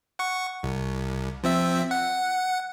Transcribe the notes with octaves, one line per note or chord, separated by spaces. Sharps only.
F#5 C#6
C2
F3 C4 E5
F#5